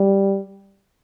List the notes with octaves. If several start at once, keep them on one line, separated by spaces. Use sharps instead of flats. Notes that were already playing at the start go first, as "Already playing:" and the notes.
Already playing: G3